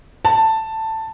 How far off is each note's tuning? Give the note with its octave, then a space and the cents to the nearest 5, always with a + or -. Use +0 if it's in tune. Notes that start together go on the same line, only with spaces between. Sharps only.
A5 +10